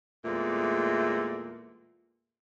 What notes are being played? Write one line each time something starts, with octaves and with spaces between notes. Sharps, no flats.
E2 A#2 G#3 A3